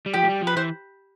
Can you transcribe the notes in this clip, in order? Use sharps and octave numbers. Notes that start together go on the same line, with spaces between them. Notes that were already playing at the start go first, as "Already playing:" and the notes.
G3
F3 G4
A3
G3
F3
B4
E3 C5